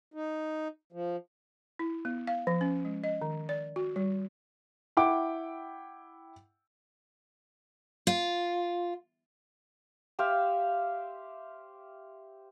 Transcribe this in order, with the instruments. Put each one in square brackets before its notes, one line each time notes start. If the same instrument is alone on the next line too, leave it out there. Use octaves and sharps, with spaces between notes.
[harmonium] D#4
F3
[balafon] E4
B3
F5
F3
C#4
G#3
D#5
D#3
D5
F#4
G3
[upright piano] E4 F#5 G5 D6
[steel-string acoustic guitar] F4
[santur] G4 C5 E5 F5